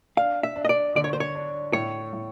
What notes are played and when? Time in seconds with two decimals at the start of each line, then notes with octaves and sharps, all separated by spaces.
0.17 D4 F5
0.43 E5
0.56 D4
0.65 D#5
0.69 D5
0.95 D3 D5
1.04 C#5
1.13 C5
1.20 C#5
1.35 D4
1.73 A2 C#5
2.13 A2